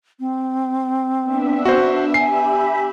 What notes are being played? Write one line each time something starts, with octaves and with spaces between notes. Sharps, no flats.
C4
B3 D4 E5
F#4 C5
G4 E5 G#5 B5 C7